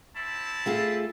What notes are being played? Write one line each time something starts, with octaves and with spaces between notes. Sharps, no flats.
C4 E4 A5
A3 F4 G#4